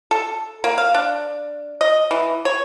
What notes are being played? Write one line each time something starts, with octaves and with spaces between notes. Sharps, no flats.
A4
A#3
F5
D4
D#5
E3
C#5